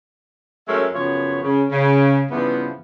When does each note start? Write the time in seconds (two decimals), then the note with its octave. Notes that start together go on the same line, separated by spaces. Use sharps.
0.68 F#3 G#3 A3 C#4 A#4 E5
0.94 F#2 C#3 F3 B3 C#5
1.43 C#3
1.71 C#3
2.30 G2 C#3 E3 F3 B3